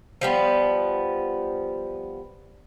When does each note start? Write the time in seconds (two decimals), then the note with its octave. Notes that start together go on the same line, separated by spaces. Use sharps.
0.21 F3 G3 B3